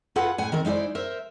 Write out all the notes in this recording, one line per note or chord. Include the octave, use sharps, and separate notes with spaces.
F4 G#4 A4 B4 F5 F#5
A2 F#5 G#5
D#3 C4 A#4
G#3 D#4 E4 C5 D5
A#4 C5 E5